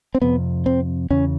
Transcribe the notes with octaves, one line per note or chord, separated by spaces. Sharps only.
C4
F2 C3 B3
C4
E2 C#3 C#4